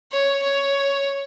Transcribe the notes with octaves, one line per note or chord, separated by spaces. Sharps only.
C#5
C#5